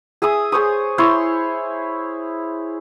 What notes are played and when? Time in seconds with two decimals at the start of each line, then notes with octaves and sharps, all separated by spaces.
0.22 G#4 E5 G#5 D#6
0.52 G#4 C5 C#5 D#6
0.98 E4 C5 C#5 C6